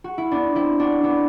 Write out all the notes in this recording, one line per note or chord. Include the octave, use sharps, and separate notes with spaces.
F#4
E4
B3 D4
C4 E4
D4 F#4
B3 D4